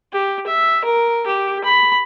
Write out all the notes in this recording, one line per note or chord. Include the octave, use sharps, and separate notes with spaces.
G4
E5
A#4
G4
B5